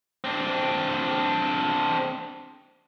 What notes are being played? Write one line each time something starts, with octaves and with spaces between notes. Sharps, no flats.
C4 D4